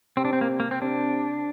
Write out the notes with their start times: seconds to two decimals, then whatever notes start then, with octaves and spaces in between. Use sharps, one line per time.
0.17 C3 C4
0.25 D4
0.33 C4
0.41 A#3
0.60 A#3
0.71 C4
0.82 C3 D4